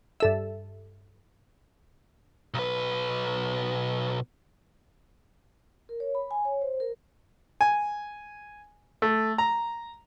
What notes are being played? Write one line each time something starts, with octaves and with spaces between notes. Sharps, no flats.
G2 A4 E5
B1 B4
A#4
C#5
B5
G#5
C#5
C5
A#4
G#5
A3
A#5